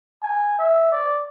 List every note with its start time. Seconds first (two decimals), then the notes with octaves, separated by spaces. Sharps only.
0.22 G#5
0.58 E5
0.92 D5